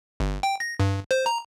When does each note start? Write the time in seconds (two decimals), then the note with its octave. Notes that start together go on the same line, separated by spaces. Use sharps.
0.20 G1
0.43 G5
0.60 A#6
0.80 G2
1.11 C5
1.26 A#5